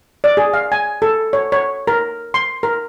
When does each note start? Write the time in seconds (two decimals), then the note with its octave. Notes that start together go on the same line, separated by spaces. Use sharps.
0.24 D5
0.37 G#4
0.54 F5
0.72 G#5
1.02 A4
1.33 C#5
1.52 C#5
1.87 A#4
2.34 C6
2.63 A#4